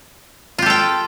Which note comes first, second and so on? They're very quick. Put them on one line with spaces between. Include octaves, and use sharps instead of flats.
F4 G4 A4 G5